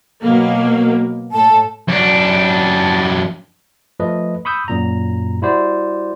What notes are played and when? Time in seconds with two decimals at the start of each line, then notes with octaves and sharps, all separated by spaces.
0.21 B2 F#3 A#3
1.32 A2 A4 A5
1.88 F#2 D4
4.00 F3 A3 B4 D#5
4.45 B5 C#6 D#6 E6 G6
4.68 F#2 A#2 A#5
5.42 G3 E4 F#4 C5 D5